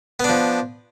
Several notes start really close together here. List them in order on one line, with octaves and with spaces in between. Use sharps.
B3 D4 F3